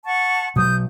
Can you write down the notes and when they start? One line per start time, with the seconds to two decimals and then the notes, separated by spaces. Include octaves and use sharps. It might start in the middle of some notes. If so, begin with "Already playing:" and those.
0.06 F#5 A5 C#6
0.56 B2 F#3 D#6 G6